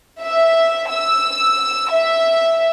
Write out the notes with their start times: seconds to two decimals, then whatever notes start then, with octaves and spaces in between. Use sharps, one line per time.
0.20 E5
0.91 E6
1.91 E5